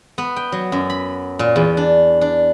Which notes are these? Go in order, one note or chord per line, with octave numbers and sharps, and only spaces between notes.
B3
G5
F#3
F#2
B5
A#2
E2
D4
D4